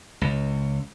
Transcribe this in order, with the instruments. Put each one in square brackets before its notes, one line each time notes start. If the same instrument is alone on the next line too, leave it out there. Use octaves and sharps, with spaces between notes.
[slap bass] C#2